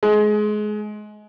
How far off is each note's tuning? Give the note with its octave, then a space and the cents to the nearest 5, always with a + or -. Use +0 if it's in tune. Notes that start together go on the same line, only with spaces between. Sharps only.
G#3 +25